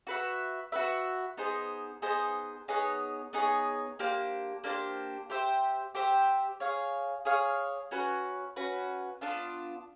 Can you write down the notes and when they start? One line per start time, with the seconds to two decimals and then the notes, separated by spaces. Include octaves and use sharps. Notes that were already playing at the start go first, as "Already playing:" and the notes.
0.07 F#4 B4 E5
0.72 F#4 B4 E5
1.37 B3 D#4 G#4 C5
2.02 B3 D#4 G#4 C5
2.68 B3 D#4 G#4 C#5
3.33 B3 D#4 G#4 C#5
3.99 A#3 D4 G4 C5
4.64 A#3 D4 G4 C5
5.30 G4 C5 E5
5.95 G4 C5 E5
6.60 G#4 C#5 F5
7.25 G#4 C#5 F5
7.91 C#4 F#4 B4
8.56 C#4 F#4 B4
9.21 B3 D4 F4